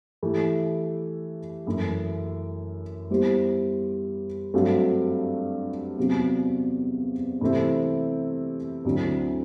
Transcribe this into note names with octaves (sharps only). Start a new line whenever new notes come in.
E3 A3 E4 G4
F#2 E3 A3 E4
G3 B3 E4 G4 C5
G2 F#3 A3 C4 F#4
E2 C3 F#3 C4
C3 E3 A3 C4 E4
D2 D3 F#3 C4 E4